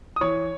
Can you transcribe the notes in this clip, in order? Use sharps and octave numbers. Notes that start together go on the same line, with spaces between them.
D#6
E3 C#5 C#6